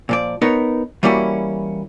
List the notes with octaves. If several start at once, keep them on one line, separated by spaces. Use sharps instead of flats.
A#2 F3 D5
B3 D#4 A#4 C#5
E3 G3 A#3 C#4 E4 F#4